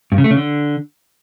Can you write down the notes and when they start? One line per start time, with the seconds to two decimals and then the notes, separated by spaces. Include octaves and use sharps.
0.12 G2
0.18 C#3
0.24 A3
0.31 C#3
0.37 D3